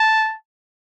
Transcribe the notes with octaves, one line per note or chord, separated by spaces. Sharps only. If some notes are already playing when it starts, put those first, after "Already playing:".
Already playing: A5